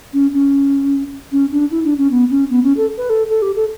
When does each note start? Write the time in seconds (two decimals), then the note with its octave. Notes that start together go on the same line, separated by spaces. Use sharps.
0.13 C#4
0.33 C#4
1.32 C#4
1.51 D4
1.71 E4
1.85 D4
1.98 C#4
2.11 B3
2.30 C#4
2.50 B3
2.63 C#4
2.77 A4
2.98 B4
3.10 A4
3.30 A4
3.42 G4
3.56 A4